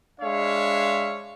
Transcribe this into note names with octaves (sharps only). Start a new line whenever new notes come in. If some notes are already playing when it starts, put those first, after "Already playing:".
G#3 D4 C#5 E5 F5